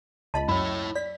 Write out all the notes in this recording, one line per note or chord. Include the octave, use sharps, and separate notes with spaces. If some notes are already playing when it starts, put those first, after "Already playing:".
C#2 D#5 A5 B5
F#2 E4 C#5 B5
D5 B6